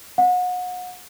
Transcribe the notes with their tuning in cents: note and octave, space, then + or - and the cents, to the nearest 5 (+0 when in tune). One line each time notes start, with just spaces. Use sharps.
F#5 -35